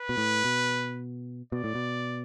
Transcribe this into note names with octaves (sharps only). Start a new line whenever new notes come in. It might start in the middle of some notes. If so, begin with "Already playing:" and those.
Already playing: B4
B2
A2
B2
B2 D5
A2
B2